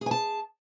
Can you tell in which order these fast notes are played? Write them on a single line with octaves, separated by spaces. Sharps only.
G#4 G#5 A5